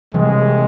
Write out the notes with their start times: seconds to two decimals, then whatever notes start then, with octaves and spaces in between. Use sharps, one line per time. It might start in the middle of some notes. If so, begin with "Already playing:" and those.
0.14 C3 E3 G3 G#3